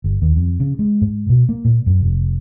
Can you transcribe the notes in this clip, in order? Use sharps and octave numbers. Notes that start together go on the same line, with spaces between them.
G1
D#2
F2
C#3
G#3
G#2
B2
A#3
A#2
F#2
F1